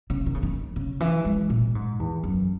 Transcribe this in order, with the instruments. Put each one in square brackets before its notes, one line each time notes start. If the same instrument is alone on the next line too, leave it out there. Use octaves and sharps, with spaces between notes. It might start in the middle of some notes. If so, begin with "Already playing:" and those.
[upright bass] C#3
D#3
C#3
D#3
C#3
E3
G#3
A#2
G#2
E2
F#2